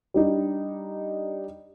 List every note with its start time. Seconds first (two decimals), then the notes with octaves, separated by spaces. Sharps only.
0.14 G3 D4 D#4